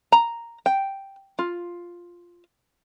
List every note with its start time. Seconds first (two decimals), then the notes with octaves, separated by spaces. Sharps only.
0.12 A#5
0.66 G5
1.39 F4